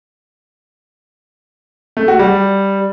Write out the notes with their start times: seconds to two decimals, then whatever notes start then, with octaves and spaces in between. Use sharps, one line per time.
1.97 A3
2.08 F#4
2.20 G3